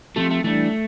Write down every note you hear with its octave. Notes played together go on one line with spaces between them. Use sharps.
F3 A3 C4 G4
A3
E3 G3 A3 D4